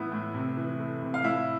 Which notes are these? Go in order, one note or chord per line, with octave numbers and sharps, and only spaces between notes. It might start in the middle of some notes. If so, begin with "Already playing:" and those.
Already playing: A2 E3 B3 E4
A2
C3
E3
A3
C3
F5
A2 E4 E5